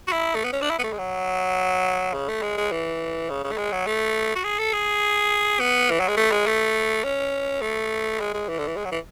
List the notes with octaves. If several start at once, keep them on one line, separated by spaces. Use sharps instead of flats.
F#4
E4
A3
B3
C#4
D4
E4
B3
A3
G#3
F#3
C#3
A3
G#3
G#3
E3
C#3
C#3
A3
G#3
F#3
A3
F#4
G#4
A4
G#4
B3
E3
F#3
G#3
A3
G#3
A3
C#4
A3
G#3
G#3
E3
D3
E3
G#3
F#3
E3